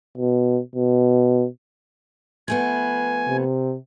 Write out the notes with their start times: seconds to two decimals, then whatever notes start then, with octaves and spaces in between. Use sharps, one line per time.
0.18 B2
0.76 B2
2.48 F3 A3 B3 G#5
3.28 C3